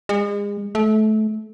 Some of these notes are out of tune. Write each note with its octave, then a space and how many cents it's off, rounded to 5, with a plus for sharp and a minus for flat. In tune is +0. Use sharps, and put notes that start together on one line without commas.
G#3 -35
A3 -25